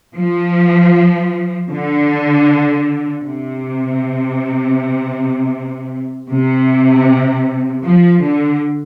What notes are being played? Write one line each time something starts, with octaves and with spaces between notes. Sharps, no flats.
F3
D3
C3
C3
F3
D3